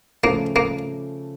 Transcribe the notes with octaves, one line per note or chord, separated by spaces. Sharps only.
C#3 F3 A3 A#3 C#4
A#3